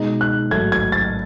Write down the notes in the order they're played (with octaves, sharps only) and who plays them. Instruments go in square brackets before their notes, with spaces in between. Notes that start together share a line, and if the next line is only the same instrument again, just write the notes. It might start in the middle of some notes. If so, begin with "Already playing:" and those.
Already playing: [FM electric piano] B2 G#3 D#4
[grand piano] F#6
[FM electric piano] A1 G#2 F#3 A3 [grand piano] G#6
[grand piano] G#6
A6